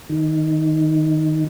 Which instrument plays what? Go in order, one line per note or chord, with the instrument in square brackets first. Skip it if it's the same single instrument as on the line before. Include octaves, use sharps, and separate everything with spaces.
[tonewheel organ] D#3